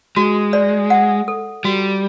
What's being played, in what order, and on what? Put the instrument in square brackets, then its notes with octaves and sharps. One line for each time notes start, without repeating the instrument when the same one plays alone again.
[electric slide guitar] G#3 [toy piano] F#4
[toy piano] D5
F#5
A4
[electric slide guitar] G3 [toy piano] F#4